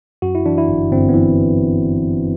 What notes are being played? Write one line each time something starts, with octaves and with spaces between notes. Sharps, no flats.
F#2 F#4
E4
E3 D4
E4
G1
G1 C4
B3
E3